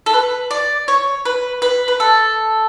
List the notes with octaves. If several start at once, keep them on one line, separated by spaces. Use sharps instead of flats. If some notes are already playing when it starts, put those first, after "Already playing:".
A4
B4
D5
C#5
B4
B4
B4
A4